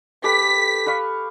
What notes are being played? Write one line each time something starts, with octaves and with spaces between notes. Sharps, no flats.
G4 A4 B4 B6
B4 F5 C#6